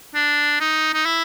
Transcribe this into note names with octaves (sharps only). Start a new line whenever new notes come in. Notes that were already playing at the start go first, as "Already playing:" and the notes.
D4
D#4
D#4
E4